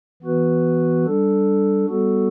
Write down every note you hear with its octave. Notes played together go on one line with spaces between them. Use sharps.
E3 B3 F#4 B4
G3 D4 A4
G3 B3 F#4 A4